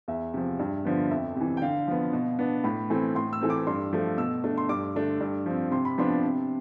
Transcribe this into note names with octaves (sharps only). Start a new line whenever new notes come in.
E2 E5
C3 F3
G2
D3 F3 B3
F2 E5
C3 E3
G5
D3 F5
F3 B3
B2
B3 D4
A2 B5
E3 A3 C4
A2 C6
E6
E3 A3 C4
D6
G2 C6
F3 A3
B2 E6
A3 D4
C6
G2 D6
D3 A3 D4
G2
F3 C4
C3 C6
B5
F3 B3 D4 C6
C3